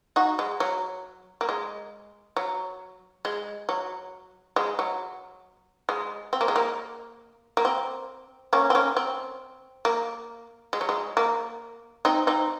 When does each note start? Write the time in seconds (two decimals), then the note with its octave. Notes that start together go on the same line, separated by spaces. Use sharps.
0.16 D#4 F#4
0.39 G#3
0.60 F#3
1.41 A#3
1.49 G#3
2.36 F#3
3.25 G#3
3.69 F#3
4.56 G#3
4.79 F#3
5.89 G#3
6.33 C4
6.41 A#3
6.48 G#3
6.56 A#3
7.57 A#3
7.65 C4
8.53 A#3 C#4
8.70 C4
8.75 A#3 C#4
8.97 C4
9.85 A#3
10.73 G#3
10.81 F#3
10.89 G#3
11.17 A#3
12.05 C4 D#4
12.27 C4 D#4